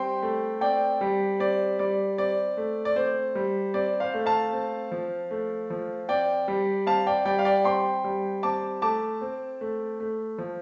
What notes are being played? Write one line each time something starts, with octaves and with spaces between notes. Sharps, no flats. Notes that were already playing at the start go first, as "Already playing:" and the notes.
Already playing: G3 C4 G5 C6
A3
C4 D5 G5
G3
C4 D5
G3 D5
C4 D5
A3
D5
C4 C5
G3
C4 D5
C5 F5
A3
F5 A5
C4
F3
A3
F3
C4 D5 G5
G3
C4 F5 A5
D5 G5
G3 D5 G5
F5
D5 G5
C4 G5 C6
G3
C4 A5 D6
A3 A5 D6
C4
A3
A3
F3